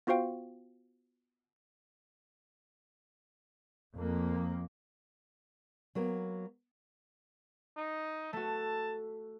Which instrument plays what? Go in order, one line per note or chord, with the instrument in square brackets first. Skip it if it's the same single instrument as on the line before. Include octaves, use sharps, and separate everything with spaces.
[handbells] B3 F4 F#4 C5 F5 G5
[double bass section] F2 A#3
[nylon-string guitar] F#3 A#3 B3
[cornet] D#4
[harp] A3 F#4 [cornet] A5